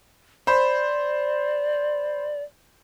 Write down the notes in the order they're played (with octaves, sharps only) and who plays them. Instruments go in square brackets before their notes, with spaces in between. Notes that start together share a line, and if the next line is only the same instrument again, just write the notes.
[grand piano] C5 B5 [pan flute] D5